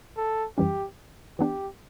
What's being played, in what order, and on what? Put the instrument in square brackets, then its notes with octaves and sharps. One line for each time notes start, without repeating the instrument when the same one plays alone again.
[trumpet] A4
[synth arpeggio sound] F#2 E3 G3 C#4 [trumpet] G4
[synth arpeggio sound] E3 B3 D4 [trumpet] G4